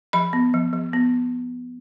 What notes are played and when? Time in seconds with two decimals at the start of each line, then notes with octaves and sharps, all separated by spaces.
0.13 F3 B5
0.33 B3
0.54 F3
0.73 F3
0.93 B3